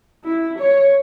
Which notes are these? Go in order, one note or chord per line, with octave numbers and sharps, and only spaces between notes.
E4
C#5